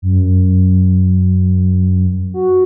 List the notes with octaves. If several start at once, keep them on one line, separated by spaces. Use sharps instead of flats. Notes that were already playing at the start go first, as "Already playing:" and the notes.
F#2
F#4